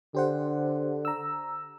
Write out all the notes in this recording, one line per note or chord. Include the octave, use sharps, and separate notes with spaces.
D3 G4 C5 F#5
A#5 E6